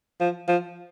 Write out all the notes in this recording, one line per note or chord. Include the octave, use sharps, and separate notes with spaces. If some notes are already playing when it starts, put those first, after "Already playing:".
F3
F3